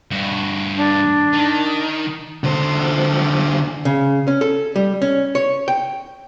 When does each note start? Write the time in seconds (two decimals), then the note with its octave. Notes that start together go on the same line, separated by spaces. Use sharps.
0.11 G2 F#4
0.76 D4
1.33 D#3
2.44 D3 C5
3.85 C#3
4.28 C#4
4.41 A4
4.76 G3
5.02 C#4
5.35 C#5
5.68 G5